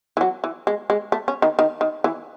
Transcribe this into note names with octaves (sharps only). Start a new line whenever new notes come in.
E3
F#3
E3
G#3
G#3
A3
C#4
D#3
D#3
D#3
E3